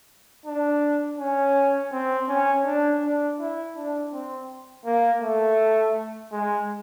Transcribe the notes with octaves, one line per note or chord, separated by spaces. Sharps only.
D4
C#4
C4
C#4
D4
D4
E4
D4
C4
A#3
A3
G#3